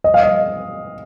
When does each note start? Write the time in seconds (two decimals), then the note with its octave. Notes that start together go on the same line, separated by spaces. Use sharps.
0.04 D#5
0.14 F5
0.23 D#5